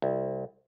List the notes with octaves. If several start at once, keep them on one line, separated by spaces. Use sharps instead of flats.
C2